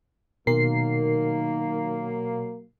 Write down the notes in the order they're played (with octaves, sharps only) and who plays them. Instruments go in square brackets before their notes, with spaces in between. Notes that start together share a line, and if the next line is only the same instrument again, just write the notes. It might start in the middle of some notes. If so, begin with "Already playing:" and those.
[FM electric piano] B2 A#4 C7 [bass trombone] D#3 [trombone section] F#3 A#3